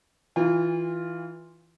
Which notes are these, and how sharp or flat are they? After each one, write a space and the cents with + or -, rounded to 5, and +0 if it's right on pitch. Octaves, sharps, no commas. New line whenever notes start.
E3 -10 F4 +0 G#5 -40